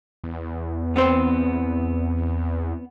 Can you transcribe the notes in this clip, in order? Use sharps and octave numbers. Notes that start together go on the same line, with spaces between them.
E2
B3 C4 C5